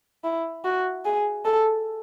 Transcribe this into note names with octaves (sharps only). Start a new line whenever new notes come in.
E4
F#4
G#4
A4